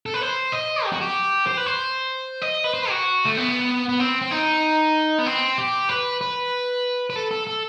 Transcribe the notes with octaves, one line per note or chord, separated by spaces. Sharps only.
A4
B4
C5
D#5
G4
F#4
G4
C5
B4
C5
D#5
B4
C5
F#4
A3
B3
B3
C4
C4
D#4
B3
C4
G4
B4
B4
B4
A4
A4
A4